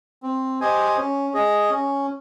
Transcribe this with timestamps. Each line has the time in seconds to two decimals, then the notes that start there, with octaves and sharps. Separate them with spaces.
0.23 C4
0.61 G4 C5 D#5 G#5
0.97 C#4
1.34 G#4 D#5
1.70 C#4